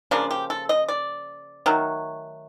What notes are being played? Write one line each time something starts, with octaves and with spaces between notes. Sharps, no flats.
C#3 F3 A#3 D4
G4
A4
D#5
D5
D#3 F#3 A3